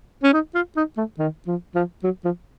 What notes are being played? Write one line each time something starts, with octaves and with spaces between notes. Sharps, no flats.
C#4
D#4
F4
D#4
A3
D#3
F3
F3
F#3
F3